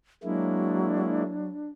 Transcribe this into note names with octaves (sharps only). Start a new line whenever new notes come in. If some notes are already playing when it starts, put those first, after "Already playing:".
F#3 G#3 A#3 D4 E4